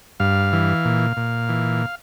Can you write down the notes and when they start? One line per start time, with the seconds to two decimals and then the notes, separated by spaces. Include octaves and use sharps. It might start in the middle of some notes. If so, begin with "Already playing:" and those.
0.20 G2 F5
0.53 E3
0.85 A#2
1.17 A#2
1.49 E3